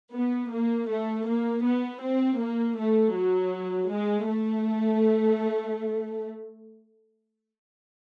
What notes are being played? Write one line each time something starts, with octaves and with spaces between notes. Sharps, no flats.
B3
A#3
A3
A#3
B3
C4
A#3
A3
F#3
G#3
A3